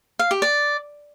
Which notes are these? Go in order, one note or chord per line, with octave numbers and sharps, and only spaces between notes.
F5
G4
D5